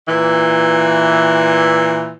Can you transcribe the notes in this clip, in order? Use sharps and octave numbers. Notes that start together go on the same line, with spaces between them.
A#2 E3